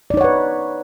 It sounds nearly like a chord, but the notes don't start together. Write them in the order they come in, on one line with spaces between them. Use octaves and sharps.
D5 D#4 C#5 F#5 B4